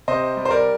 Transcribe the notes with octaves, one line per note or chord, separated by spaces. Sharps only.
C3 C5 D#5
G3
C5
A#4 D5